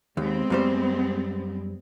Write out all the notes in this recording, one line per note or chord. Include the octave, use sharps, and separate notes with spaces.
D#2 G#3 B3 C4
F#2 G3 C5